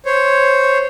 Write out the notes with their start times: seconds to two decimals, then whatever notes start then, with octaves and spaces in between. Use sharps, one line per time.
0.06 C5 C#5